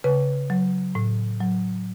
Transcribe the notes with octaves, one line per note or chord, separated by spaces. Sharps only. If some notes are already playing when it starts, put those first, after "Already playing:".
C#3 B4
F#3
A2
F#3